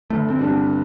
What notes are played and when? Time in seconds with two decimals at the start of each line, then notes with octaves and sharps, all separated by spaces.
0.10 G1 A3
0.30 C4
0.39 G2 G3 D4 G4
0.47 C4